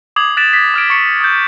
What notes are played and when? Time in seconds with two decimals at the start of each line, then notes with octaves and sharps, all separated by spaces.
0.16 D6 D#6 G#6 C7 F#7
0.37 F#6 A6 B6 D7 E7
0.53 B6
0.74 D6 F6 G#6 D7
0.90 C#6 C#7
1.21 D#6 G6